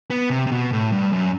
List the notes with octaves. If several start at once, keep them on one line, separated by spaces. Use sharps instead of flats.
B3
C3
C3
B2
A2
G2
F#2